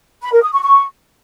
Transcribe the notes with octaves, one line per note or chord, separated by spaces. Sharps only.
B5
A#4
D#6
C#6
C#6